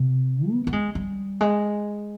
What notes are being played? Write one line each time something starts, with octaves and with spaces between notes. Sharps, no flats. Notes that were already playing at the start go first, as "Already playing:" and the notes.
Already playing: C3
B3
B3
G#3
G3
G#3